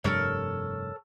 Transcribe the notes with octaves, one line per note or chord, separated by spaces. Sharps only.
F1 G2 G3 A4 A#4 C#5